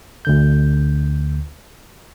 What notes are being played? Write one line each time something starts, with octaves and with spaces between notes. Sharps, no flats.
D2 D3 G6